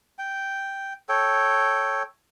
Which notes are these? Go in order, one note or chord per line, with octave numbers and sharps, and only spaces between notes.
G5
A4 C#5 G5